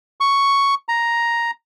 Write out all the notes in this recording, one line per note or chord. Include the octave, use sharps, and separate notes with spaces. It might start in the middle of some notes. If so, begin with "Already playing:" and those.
C#6
A#5